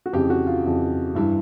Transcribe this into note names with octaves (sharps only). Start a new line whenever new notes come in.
F#4
F2 C#3 E3 G4
F#4
F4
F2 C#3 E3
G2 E3 E4